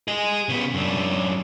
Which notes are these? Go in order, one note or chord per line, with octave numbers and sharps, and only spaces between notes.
G#4 D#5
C#3 B3
F#2 D4